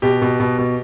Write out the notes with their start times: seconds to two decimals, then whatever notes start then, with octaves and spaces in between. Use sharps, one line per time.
0.02 B2 G4
0.22 B2
0.40 B2
0.58 B2